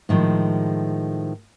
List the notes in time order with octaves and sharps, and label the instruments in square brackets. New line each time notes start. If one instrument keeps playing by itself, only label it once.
[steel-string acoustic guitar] A2 D#3 F3 G#3